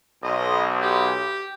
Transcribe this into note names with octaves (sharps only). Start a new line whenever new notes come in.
B1 D#5
G4